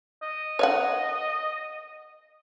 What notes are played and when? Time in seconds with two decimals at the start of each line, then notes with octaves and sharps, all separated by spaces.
0.22 D#5
0.59 C#5 F5 F#5